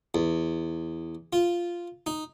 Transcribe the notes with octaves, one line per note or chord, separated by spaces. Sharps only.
E2
F4
D#4